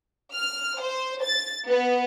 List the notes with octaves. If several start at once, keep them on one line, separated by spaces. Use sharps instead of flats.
F6
C5
A6
B3